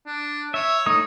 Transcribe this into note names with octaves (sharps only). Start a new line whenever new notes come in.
D4
C#5 E5
A3 D#4 D#6